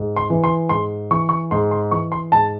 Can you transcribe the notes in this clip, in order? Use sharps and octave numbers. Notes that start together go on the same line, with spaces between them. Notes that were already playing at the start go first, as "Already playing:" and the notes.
Already playing: G#2
C6
E3
C6
G#2 C6
E3 C#6
C#6
G#2 C6
C6
E3 C#6
C6
G#2 A5